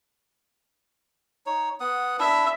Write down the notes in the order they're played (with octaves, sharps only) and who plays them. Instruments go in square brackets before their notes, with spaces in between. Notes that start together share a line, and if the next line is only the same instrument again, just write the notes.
[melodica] D#4 C#5
B3 F#5 D#6
[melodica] D4 E4 [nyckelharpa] E5